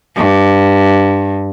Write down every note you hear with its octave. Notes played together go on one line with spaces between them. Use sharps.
G2